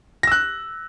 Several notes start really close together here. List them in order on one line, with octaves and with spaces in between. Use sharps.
A#6 E6 F#6